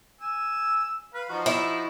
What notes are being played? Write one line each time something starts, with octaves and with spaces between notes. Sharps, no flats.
G#5 E6
B4 F5
F3 D#4 F#4
E4